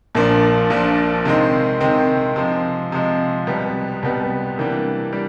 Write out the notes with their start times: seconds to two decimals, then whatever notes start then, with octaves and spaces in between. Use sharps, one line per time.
0.15 A#1 A#2 F3 A#3 D4
0.70 A#1 A#2 F3 A#3 D4
1.25 C3 D#3 G#3 C4
1.81 C3 D#3 G#3 C4
2.36 C3 F3 G#3
2.92 C3 F3 G#3
3.47 C2 B2 G3 B3
4.03 C2 B2 G3 B3
4.57 C3 E3 G3 A#3 D4
5.12 G3 A#3 D4